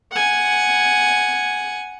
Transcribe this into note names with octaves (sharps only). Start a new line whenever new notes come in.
F#5 G#5